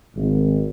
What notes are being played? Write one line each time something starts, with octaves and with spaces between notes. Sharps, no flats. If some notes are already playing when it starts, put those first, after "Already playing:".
G#1